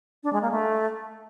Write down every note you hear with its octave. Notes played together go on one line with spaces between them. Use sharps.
D4
G#3
A#3
A3